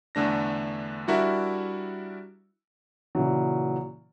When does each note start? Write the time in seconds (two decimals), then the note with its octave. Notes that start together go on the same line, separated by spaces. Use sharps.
0.15 E2 D3 A3 D4 A#6
1.08 G3 D4 E4 F#4 A#4 E5
3.15 A#2 C#3 E3 F#3